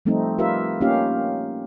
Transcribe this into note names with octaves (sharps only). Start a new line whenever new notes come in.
F3 G3 A3 C4 D#4
D#4 F4 G4 A#4 B4 E5
A#3 C#4 D#4 F4 G4 F5